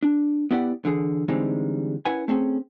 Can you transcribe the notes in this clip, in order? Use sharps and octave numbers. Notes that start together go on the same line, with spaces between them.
D4
B3 E4 G4 D5 F#5
D3 E3 G#4
D3 E3 G3 G#3 C4 D#4
C#4 E4 A#4 B4 F#5 G#5
A3 C4 C#4 G#4